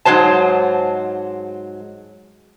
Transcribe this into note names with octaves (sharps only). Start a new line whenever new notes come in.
G#2 F3 F#3 C5 A5